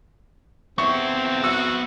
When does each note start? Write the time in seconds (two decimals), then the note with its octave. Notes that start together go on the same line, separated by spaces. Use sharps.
0.78 B3 C4 E5 C#6
1.44 F#4 E6